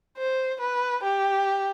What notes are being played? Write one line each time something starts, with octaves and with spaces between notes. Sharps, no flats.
C5
B4
G4